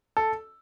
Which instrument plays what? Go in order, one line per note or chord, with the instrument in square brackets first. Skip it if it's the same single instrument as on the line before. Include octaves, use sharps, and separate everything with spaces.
[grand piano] A4